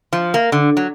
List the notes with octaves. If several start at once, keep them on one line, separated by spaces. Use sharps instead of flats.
F3
A#3
D3
F#3